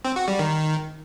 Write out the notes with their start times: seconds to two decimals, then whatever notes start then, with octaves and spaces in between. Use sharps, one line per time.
0.05 C4
0.16 F#4
0.28 G3
0.39 D#3